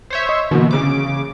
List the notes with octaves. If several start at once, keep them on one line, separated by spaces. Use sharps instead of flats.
C5 C#5 E5
D#5
B2 D3 E3 A#3
C#3 D6